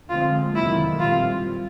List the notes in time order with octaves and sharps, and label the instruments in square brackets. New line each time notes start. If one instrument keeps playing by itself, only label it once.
[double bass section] D3 F3 G#3 C4 [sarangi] F4
[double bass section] F2 C3 D#3 F#3 A#3 [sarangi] E4
[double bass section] A#2 G3 C4 [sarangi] F4